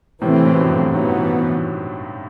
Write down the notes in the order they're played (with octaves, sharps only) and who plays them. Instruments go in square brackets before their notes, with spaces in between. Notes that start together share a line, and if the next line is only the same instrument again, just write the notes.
[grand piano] A2 C3 [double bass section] E3 A3 C4
[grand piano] A2
B2
F#2 A2
G2
[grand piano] D#3 F#3 [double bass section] E3 B3